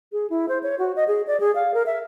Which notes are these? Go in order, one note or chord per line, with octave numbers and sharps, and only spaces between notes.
G#4
E4
C5
C#5
F#4
D#5
G#4
D5
G#4
F5
A#4
E5